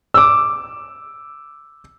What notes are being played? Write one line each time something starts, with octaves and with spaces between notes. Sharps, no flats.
D6 E6